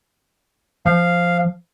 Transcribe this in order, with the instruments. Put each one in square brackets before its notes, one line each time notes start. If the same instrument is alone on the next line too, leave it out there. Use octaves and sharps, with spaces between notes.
[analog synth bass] F3 [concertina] F5